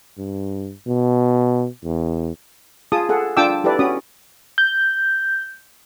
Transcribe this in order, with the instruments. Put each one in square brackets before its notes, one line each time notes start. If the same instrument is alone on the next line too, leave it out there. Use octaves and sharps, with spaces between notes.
[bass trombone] G2
B2
E2
[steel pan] F4 G#4 A5 D#6
G#4 A4 F#5
D4 F4 G5 A5 D6 E6
E4 G4 A4 B4 D5
C#4 F#4 D#6
[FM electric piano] G6